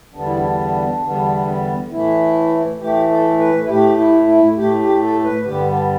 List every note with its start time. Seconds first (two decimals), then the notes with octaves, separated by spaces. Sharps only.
0.14 E2 D3 G3 B3 D4
0.26 E4
0.37 D4
1.03 E2 D3 G3 B3
1.91 A2 E3 A3 E4
2.80 A2 E3 A3 G4
3.09 A4
3.39 B4
3.65 E4
3.68 A2 A3 G4
3.98 E4
4.27 E4
4.57 A2 A3 G4
4.79 G4
5.01 A4
5.24 B4
5.45 G2 D3 G3 B3 G4
5.68 D4